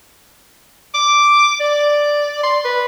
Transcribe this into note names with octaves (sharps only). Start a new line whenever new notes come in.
D6
D5
C6
B4